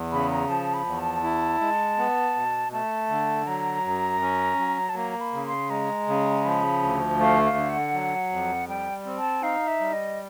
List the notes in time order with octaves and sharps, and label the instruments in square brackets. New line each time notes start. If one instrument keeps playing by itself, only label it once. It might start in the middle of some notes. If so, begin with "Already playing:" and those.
Already playing: [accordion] E2
[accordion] C#3 [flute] B5
[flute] A#5
[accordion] F3 [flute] A5
[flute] B5
[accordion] E2
[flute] A5
[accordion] E4
G#3
B3
B2
[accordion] A3 [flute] A5
[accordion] D3
[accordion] F#3 [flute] A#5
[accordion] F#2
C#4
F#3
[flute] A5
[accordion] A#3 [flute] A#5
[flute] B5
[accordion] C#3
[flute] C6
[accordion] G#3 [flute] A#5
[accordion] C#3
[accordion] F3 [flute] B5
[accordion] D2
[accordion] A3 [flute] F5
[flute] F5
[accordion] D3
[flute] F#5
[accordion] F#3
F2
[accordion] G3 [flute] G5
[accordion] C4
[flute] A5
[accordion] D#4 [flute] F5
[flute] E5
[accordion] G3
[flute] D#5